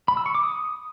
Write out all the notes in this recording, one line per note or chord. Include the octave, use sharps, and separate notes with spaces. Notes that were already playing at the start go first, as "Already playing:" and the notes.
B5
E6
C#6
D6
D#6